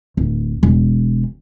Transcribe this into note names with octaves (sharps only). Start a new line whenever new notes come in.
D1
E1